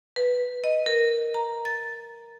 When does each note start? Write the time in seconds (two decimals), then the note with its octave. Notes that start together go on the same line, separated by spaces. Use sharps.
0.16 B4
0.64 D#5
0.86 A#4
1.34 A#5
1.65 A6